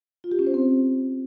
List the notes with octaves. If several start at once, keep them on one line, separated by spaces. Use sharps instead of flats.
F4
G4
C#4
C5
C4